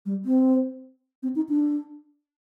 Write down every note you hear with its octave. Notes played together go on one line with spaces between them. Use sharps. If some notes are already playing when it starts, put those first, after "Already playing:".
G3
C4
C4
D#4
D4